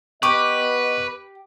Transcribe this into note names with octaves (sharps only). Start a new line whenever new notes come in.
B3 G4 B4 D#5 C#6